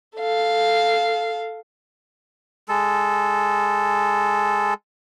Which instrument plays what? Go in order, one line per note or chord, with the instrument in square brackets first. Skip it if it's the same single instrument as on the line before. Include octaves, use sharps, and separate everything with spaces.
[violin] A4 F5
[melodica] G#3 A4